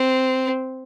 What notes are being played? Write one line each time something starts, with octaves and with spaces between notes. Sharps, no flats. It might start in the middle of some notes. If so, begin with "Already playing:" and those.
Already playing: C4